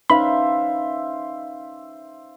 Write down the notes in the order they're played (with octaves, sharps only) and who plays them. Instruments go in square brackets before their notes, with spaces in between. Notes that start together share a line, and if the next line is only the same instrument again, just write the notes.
[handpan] C#4 D#4 B4 [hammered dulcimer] C5 E5 F5 [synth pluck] B5